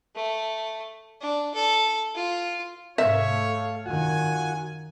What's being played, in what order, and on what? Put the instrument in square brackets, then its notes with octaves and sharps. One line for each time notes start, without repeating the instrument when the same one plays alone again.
[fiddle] A3
D4
A4
F4
[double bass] G#2 C3 [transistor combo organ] A4 F5 [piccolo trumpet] C#5 [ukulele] E5
[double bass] A3
[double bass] F#2 D#3 [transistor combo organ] F4 F#4 F#5 [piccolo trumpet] G#5